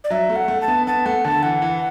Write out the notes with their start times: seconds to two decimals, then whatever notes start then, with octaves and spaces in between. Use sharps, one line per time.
0.04 D5
0.10 F#3 E5
0.30 A3
0.36 F#5
0.48 A3
0.62 A5
0.68 B3
0.87 B3 A5
1.06 A3 F#5
1.25 D3 A5
1.43 E3 F#5
1.62 E3